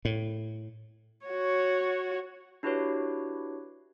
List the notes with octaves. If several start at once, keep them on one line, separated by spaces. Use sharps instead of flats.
A2
F#4 C#5
D4 E4 F#4 G4 B4 C#5